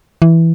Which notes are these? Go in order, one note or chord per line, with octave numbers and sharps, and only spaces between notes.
E3